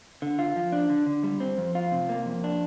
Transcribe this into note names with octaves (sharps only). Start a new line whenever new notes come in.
D3
F4
F3
D4
D3
D3
G3
C4
F2
F4
C3
A#3
F2
D4